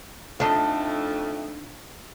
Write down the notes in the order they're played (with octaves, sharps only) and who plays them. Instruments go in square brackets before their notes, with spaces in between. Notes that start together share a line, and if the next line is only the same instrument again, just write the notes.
[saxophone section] F2 A3 [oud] D4 D#4